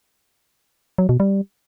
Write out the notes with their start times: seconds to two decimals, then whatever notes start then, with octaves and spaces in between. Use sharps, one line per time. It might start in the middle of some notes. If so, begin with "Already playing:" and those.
0.98 F#3
1.09 B2
1.20 G3